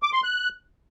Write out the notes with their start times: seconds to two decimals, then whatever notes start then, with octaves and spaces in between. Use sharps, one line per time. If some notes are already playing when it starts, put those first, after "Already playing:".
0.03 D6
0.13 C6
0.24 F#6